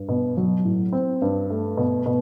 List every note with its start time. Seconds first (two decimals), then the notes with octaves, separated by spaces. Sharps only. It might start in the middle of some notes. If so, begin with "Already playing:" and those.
Already playing: G2
0.09 B2
0.37 F#3
0.65 A2
0.92 C4
1.22 G2
1.50 A3
1.77 B2
2.06 B2